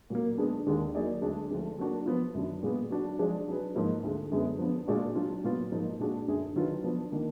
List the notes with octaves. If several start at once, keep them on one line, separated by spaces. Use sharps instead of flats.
A#2 F#3 A#3
D3 G#3 B3 D4
D#2 D#3 G#3 D4
F#3 A#3 D#4 G#4 D5
D2 D3 G#3 D4
D2 D3 F3 G#3 D4
F#3 A#3 D4 F#4 A#4
F3 B3 F4
F#2 D#3 F#3 D4
A#2 G#3 B3
F#3 D4 F#4
F3 G#3 D4 G#4 D5
F#3 D4 G#4 B4
G#2 F3 A#3 D#4
D2 D3 G#3
F#2 D3 G#3 B3
F3 B3 D4
A#2 G#3 D4 F#4 D5
F#3 D4 F4
A#2 F#3 B3 F4
G#2 F3 A#3 D#4
A#2 G#3 D4 F#4
F#2 D3 F#3 D4 G#4
D#3 F#3 D4 F4 B4
F3 B3 D4
D#3 A#3 D4